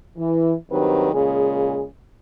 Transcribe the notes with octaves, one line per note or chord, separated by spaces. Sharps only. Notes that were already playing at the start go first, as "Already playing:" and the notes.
E3
G2 D#3 F#3 C4 G4 B4
A#2 C#3 G#3 G#4